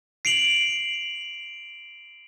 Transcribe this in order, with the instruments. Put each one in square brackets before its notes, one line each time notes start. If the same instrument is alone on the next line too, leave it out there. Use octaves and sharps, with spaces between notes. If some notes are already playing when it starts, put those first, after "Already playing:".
[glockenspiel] C7 D7 F7 F#7